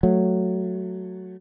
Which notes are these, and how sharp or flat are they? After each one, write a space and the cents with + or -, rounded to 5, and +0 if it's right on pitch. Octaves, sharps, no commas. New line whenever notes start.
F#3 +0 A3 +0